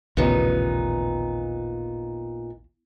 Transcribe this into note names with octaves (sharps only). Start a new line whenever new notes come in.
A1 D#2 A#2 C#3 B3 D#4